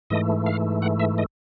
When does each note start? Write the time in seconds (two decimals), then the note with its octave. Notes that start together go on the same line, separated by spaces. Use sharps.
0.10 G#2 E3 A3 D#5
0.46 F5
0.82 F#5
1.00 E5
1.18 D#5